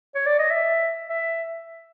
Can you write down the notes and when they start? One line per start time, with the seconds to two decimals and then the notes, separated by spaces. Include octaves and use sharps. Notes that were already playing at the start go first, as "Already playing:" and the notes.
0.15 C#5
0.26 D5
0.39 D#5
0.50 E5
1.09 E5